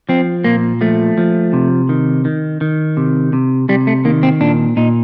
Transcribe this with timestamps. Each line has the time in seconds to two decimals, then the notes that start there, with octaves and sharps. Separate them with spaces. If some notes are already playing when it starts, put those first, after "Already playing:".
0.09 F3 C4
0.44 A#2 A#3
0.81 F3 A3
1.18 F3
1.53 C3
1.89 D#3
2.25 D#3
2.61 D#3
2.97 C3
3.33 C3
3.69 C3 G3
3.87 A3
4.05 D#3 A#3
4.23 C4
4.41 A#2 D4
4.77 A#2 D#4